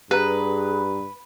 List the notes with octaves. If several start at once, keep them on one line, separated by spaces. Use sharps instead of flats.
G2 G4 G#4 B4 A#5